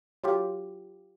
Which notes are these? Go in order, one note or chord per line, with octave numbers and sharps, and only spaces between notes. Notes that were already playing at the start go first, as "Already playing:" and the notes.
F#3 F4 G4